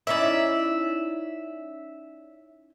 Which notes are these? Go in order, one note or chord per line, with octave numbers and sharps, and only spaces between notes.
C#4 D#4 E4 D5 E5